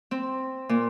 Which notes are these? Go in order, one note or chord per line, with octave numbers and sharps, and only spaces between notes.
C4
A#2